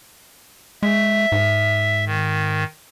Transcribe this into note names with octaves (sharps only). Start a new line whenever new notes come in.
G#3 E5
G#2
D#3